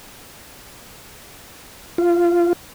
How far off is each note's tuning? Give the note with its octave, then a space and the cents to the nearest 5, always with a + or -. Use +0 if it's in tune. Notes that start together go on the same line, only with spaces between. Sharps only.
F4 -15